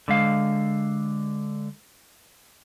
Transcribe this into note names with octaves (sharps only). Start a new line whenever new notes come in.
D3 G#3 F5